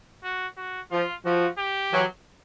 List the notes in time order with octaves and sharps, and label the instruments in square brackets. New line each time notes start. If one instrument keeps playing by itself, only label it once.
[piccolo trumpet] F#4
F#4
[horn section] F3 [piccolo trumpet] F4
[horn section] F3 [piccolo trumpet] F#4
[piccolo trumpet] G4
[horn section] E3 F#3